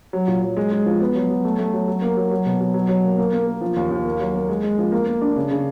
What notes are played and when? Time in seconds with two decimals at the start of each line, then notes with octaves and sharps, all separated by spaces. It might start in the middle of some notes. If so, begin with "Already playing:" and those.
0.13 F#3
0.28 A#2
0.42 F#3
0.57 G#3
0.71 G#3
0.86 F3
1.01 B3
1.15 F#3
1.30 F#3
1.44 A3
1.59 A3
1.73 F#3
1.87 F#3
2.02 A#3
2.17 F#3
2.31 F#3
2.46 B2
2.61 F#3
2.74 F#3
2.89 F#3
3.04 A#3
3.18 A#3
3.33 A#3
3.47 A#3
3.61 F3
3.76 D#2
3.91 D#2
4.05 A#3
4.20 F#3
4.35 A#3
4.49 G#3
4.63 G#3
4.78 F3
4.92 A#3
5.07 A#3
5.21 D4
5.36 C#3
5.51 C#3